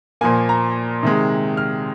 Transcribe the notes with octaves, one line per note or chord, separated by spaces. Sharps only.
A#2 F3 A#3 G#5
A#5
C3 D#3 G#3
F6